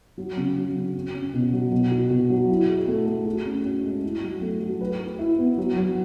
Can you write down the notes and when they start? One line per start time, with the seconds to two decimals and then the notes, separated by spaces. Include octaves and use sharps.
0.18 F#3
0.37 C#3
0.56 F#3
0.75 C#3
0.95 C#4
1.14 C#4
1.34 B2
1.53 F#3
1.72 B2
1.91 F#4
2.10 B2
2.30 F#3
2.49 E4
2.68 G#4
2.88 A3
3.07 A3
3.26 F#4
3.46 C#4
3.64 C#4
3.84 G#3
4.03 E4
4.23 F#3
4.42 A3
4.61 F#3
4.81 B4
5.00 B4
5.19 E4
5.38 B3
5.58 F#3
5.77 F#3